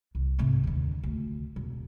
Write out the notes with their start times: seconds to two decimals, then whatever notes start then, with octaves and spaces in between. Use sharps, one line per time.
0.15 C2
0.39 G#2 C3
0.64 D#2 D3
1.03 D2
1.56 E1